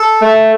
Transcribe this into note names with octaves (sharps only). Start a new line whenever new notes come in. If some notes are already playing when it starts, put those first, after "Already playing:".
Already playing: A4
A3